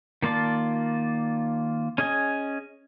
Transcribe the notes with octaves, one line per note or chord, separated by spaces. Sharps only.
D#3 A#3 F4 D5 A5
C#4 G#4 D#5 G#5